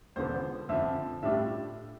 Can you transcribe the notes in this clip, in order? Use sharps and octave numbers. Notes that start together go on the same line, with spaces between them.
E1 E2 D3 F3 B3 C5
F2 D3 F3 E5
A2 G3 D4 F4 E5